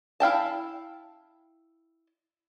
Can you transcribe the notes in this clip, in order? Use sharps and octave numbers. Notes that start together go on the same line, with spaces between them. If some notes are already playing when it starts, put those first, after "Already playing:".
E4 F5 G5 A5